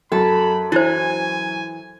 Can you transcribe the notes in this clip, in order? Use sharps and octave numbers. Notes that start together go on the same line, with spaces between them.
F#2 A4 B5
E3 E4 C5 G#5